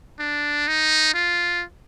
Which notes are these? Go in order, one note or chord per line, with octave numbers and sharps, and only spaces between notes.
D4
D#4
F4